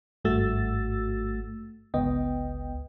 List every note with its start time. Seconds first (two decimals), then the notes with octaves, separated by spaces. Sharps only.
0.25 G#1 G2 A3 F#4 E6 A6
1.94 G1 C#2 B3 D#5 G5